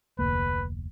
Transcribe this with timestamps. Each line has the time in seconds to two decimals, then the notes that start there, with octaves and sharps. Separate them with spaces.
0.19 F1 D2 A#3 B4